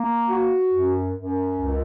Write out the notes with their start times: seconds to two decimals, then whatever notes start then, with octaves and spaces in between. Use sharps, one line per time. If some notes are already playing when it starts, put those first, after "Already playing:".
Already playing: A#3
0.29 F#4
0.72 F#2
1.15 F#2
1.58 C#2